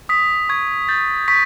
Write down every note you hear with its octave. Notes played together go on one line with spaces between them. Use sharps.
D#6 B6
C#6 G#6
G6 A6
C#6 B6